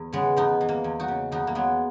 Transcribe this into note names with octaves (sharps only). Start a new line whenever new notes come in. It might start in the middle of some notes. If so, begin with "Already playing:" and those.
Already playing: E2
C#3 G#3 B3
E2 B3 D#4
E3
A#3
E2
D#4 F#4
C#3
E2 B3 D#4
A#3
F#3 G#3 B3